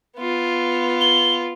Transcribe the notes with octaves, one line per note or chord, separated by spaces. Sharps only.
B3 F4
G7